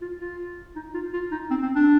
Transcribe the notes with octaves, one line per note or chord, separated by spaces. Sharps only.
F4
F4
D#4
F4
F4
D#4
C4
C4
D4